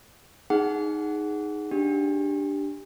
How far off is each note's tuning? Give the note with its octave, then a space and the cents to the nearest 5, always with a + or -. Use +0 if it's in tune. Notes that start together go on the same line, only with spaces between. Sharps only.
D#4 +0 G#4 +0 F#5 +0
D4 +0 G4 +0